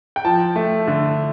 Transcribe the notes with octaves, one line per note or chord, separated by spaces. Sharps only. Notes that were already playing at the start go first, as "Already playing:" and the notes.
G5
F3 A5
A3
D3